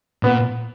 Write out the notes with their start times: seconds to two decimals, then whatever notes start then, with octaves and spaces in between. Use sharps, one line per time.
0.23 A#2 B3